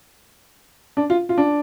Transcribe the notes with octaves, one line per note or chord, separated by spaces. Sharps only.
D4
F4
F4
D4